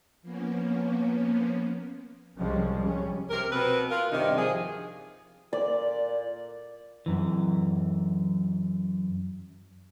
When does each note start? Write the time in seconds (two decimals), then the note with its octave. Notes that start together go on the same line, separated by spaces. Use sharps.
0.22 F3 A#3 B3 C#4
2.39 C2 F3 G3 G#3 C#4
2.80 G3 C#4
3.30 C3 A#4
3.52 B2 C4 B4
3.90 F4 A#4
4.12 G2 C3 D#3 D4 D#4
4.37 F3 G#4
5.53 A#2 D5
7.06 F#2 E3